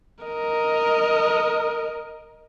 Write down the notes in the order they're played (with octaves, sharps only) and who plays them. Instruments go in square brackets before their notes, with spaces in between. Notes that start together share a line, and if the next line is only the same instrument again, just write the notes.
[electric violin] A#4 D#5